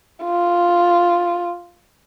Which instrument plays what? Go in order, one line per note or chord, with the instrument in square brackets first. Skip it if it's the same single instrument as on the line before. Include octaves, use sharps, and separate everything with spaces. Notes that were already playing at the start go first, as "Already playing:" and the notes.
[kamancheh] F4